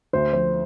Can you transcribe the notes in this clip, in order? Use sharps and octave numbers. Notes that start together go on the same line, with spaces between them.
D2 C5
F3 C5